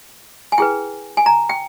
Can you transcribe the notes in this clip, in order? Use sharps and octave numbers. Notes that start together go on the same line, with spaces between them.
G#5
E4 G#4 B4 G5
G#5
A#5
G5